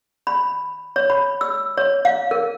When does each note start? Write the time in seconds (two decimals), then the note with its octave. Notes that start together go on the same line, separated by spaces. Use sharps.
0.27 B5
0.96 C#5
1.10 B5
1.41 E6
1.77 C#5
2.05 F5
2.31 A#4